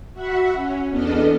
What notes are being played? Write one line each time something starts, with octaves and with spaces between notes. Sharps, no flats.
F#4 E5 F#5 B5 C#6
C#4
E2 B3 D4 A4 D#5 F6